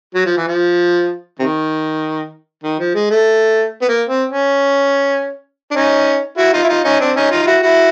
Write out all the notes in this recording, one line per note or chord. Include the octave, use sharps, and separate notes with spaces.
F#3
F3
E3
F3
C3 D#3
D#3
F3
G#3
A3
B3
A#3
C4
C#4
D4
C#4 D#4
E4 F#4
D#4 F4
E4
D#4 F4
C#4 D#4
C4 D4
C#4 D#4
D#4 F4
F4
E4 F#4
E4 F#4